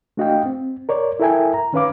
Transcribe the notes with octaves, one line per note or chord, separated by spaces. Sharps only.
A3 D4 F#4 D#5 F5 G5
C4
A#4 C#5 D5
E4 A4 A#4 E5 G5 G#5
A#5
D#3 C#4 B4 F5 D6